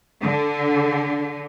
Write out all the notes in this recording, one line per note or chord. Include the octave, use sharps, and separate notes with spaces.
D3